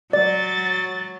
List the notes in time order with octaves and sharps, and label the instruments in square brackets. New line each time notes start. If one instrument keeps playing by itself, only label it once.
[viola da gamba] F#3 [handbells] D5 [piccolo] A6